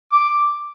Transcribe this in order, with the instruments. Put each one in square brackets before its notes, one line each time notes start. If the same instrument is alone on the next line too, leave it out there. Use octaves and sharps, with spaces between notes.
[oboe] D6